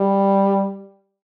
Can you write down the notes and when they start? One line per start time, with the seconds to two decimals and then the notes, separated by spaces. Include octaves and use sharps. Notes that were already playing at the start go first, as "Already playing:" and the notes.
Already playing: G3